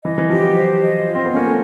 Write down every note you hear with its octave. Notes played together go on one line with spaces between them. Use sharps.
E3 D#5
E3
F3 G4
F#3
C5
D#5
F4
C4
B3
A#3 C#4
A3